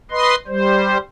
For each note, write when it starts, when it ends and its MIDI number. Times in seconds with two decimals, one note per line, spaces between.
0.11 0.35 71
0.11 0.35 75
0.11 0.35 84
0.47 0.98 55
0.47 0.98 72